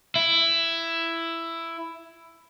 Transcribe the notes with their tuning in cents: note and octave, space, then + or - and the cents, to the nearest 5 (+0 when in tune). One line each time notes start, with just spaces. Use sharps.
E4 +10